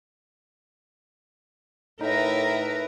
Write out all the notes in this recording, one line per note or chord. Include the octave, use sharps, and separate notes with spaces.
A2 D#4 A#4 B4 E5 A#5